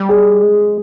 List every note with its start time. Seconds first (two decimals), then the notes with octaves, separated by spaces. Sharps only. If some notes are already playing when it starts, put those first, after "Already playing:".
Already playing: G3
0.09 G#4
0.43 G#3